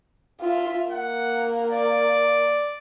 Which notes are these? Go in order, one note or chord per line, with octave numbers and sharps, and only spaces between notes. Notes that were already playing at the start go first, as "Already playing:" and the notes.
F4 E5
A#3 F#5
D5